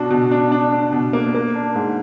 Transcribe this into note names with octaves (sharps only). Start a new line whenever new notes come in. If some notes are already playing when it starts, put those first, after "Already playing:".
Already playing: B2 D4 F#4
B2
D4
D4
D4
B2
A#3
A#3
D4
G#2